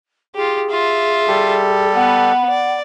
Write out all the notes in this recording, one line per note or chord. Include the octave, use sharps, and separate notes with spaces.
F4 G4 G#4
F4 E5
G3 G4 A4
B3 B4 F#5
D5